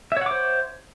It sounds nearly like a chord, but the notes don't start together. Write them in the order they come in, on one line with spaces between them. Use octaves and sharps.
E5 C#5 F#5 D6 C5